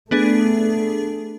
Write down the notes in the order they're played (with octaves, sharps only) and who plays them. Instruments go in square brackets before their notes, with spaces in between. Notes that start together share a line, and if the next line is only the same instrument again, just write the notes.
[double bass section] A3 [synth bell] B3 D4 G#4